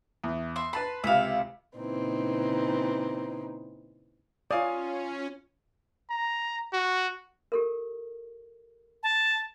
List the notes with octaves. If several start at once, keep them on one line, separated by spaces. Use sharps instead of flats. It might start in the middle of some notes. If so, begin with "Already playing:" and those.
E2
E5 C6
B4 A5 B5 C6
C#2 C3 E5 F5
A#2 C#3 E3 C4 D#4
C#4 F4 C#5 D5 F5 G#5 D#6
A#5
F#4
G4 A4 A#4
A5